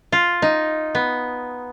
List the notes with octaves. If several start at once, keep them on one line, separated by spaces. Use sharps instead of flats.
F4
D#4
B3